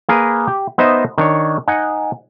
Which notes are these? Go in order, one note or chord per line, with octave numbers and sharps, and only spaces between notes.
A#3 G#4 A#4 B4
G4
B3 D#4 C5 D#5 E5
D#3 D4 C#5
D#4 F#5 G#5